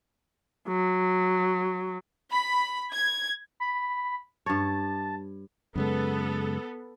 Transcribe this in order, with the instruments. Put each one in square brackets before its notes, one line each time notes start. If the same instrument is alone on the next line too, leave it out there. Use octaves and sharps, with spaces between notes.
[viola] F#3
[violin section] B5
G#6
[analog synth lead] B5
[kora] G2 C#5 [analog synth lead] A5
[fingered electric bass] F#2 C#3 G#3 [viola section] B3 A4